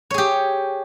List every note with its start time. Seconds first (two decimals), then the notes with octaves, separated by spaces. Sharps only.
0.11 C#5
0.14 G#4
0.18 G4